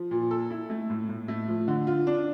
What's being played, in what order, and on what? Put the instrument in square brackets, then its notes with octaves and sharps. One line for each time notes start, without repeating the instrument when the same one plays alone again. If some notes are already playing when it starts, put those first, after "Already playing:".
Already playing: [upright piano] F3
A#2
A4
E4
A3
A2
A2
A3
F3
D3
F4
D4